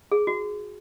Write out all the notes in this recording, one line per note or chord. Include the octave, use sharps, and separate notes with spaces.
G#4
F#4